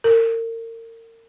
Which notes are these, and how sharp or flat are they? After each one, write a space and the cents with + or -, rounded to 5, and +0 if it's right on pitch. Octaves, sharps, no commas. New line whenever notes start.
A#4 -35